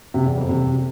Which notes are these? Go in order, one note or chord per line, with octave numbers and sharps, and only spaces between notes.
C3
E2
F2
C3